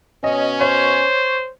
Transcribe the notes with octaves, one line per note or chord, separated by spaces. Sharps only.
B2 C#4 D#5
C5 C#5